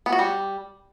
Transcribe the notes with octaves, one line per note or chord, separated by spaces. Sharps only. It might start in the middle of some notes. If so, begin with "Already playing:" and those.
B3
F#4
G3